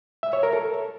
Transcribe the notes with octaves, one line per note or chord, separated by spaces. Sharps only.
E5
C#5
A#4
A4